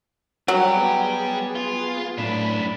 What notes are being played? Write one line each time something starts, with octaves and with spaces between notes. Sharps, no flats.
F#3 G3 G4 C#5
B3 G#4
F4
F#2 A2 D4 B5